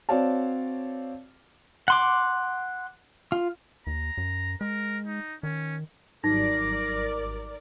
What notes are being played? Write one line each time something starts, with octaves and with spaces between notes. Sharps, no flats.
C4 F#4 C#5 D5 F5 A5
F#5 C6 D6
F4
D#2 A#5
F#2
G#3 A#4
D#4
D#3 C#4
G#1 F#3 G3 D#4 A#4 D5 A#6